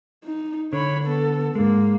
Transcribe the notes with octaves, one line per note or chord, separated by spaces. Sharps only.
D#4
D3 C#5 B5
B3 A4
G#2 G#3 A#3